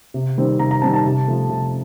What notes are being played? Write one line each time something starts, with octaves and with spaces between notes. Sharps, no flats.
C3
D#3 G3 C4
C3 A#5
A#5
D#3 G3 C4 A5
A5
C3
F3 A3
C3